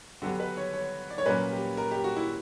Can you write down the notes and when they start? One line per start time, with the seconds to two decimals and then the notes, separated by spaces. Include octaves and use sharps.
0.22 D3 F#3 B3 G4
0.40 B4
0.57 C#5
0.74 C#5
1.10 D5
1.18 C#5
1.26 A#2 F#3 A#3 C#4 B4
1.53 G4
1.77 A#4
1.91 G4
2.04 F#4
2.16 E4